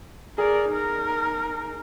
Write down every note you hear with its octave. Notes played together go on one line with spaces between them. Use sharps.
G#4 A#4 D5
D#4 A#4